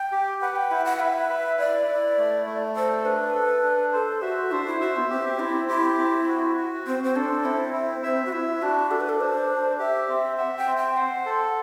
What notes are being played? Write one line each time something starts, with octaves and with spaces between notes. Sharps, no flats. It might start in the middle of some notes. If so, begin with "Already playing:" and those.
Already playing: G5
G4
B4 F#5
G5
E4 F#5
F#5
B4 E5
B4
E4 D5
E4
A3
A3
A4 C5
D4 B4
A4
D4
A4 C5
F#4 E5
D4 C5
E4
F#4 E5
B3
C4 G4
C4 E4
E4 G4
C4
F#4
F#4
C4 C5
C4
D4 A4
C4 E4
E4
C4 E5
F#4
E4 E5
D4 F#4
D4 A4
B4
A4
D4 C5
D4
G4 E5
C4
E5 F#5
G5
C4
G5
C5 F#5
A4